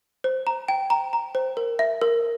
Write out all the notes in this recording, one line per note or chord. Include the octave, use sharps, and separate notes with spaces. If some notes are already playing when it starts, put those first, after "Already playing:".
C5
A#5
G5
A#5
A#5
C5
A#4
E5
A#4